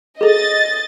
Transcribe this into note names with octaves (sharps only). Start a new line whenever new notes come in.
G#4 A4 D#5 A6